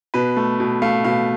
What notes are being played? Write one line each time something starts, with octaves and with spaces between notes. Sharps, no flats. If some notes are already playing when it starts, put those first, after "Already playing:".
B2 B4
A3
B2
A3 F5
B2 F5